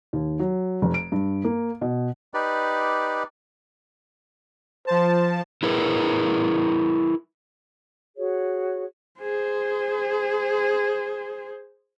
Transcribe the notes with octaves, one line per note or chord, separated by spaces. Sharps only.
D#2
F#3
F1
D7
G2
A#3
B2
D#4 G4 B4 D5
F3 C5 A5
E4 G#4 A#4 B4
F#4 G#4 C#5
G#4 C5